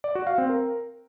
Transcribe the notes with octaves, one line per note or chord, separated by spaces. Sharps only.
D5
F#4
F5
C4
A#4